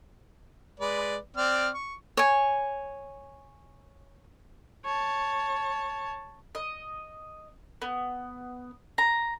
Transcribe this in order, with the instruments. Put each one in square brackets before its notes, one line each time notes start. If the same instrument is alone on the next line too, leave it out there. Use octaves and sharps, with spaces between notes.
[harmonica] G#3 B4 D5
C4 D5 F6
C#6
[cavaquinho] C#5 G#5
[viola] C#5 A5
[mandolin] D#5
B3
A#5